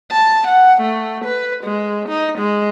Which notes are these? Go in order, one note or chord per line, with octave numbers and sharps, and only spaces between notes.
A5
F#5
A3
B4
G#3
D#4
G#3